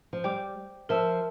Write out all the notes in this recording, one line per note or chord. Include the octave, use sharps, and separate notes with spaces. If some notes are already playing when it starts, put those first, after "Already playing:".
F3
G3 C5 G5 D6
F3 A#4 E5 A5 E6